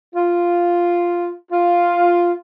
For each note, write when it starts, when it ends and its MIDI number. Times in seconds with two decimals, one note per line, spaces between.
0.15 1.31 65
1.52 2.32 65